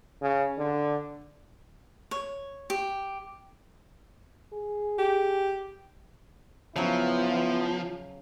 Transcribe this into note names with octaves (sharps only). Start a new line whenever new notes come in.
C#3
D3
C#5
G4
G#4
G4
C#3 F3 F#3 B3 E4